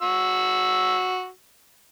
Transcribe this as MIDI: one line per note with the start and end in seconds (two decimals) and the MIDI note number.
0.02 1.28 66
0.02 1.28 88